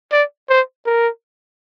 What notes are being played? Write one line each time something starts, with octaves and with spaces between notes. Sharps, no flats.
D5
C5
A#4